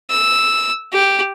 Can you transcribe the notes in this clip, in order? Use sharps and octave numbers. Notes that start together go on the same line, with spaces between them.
E6
G4